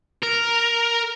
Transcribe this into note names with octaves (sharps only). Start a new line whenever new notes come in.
A#4